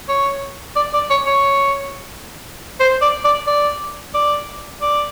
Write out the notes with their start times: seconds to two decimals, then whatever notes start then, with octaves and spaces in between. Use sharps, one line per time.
0.09 C#5
0.76 D5
0.94 D5
1.10 C#5
1.27 C#5
2.80 C5
3.01 D5
3.24 D5
3.47 D5
4.14 D5
4.82 D5